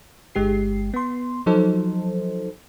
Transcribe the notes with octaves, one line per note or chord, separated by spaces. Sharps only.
G1 G#3 G4 C7
B3 C6
F3 F#3 D#4 A4 C5